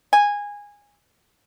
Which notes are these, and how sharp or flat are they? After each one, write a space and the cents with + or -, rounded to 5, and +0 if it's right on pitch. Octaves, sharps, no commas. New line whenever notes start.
G#5 -15